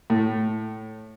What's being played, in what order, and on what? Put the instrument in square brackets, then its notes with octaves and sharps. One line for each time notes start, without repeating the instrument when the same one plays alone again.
[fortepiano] A2